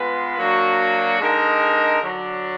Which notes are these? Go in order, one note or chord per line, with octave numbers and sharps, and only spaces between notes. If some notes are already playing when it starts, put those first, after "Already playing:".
Already playing: G#3 B3 F4 B4
F#3 A#3 D4 F#4
D3 G#3 D#4 A#4
D3 F#3 D4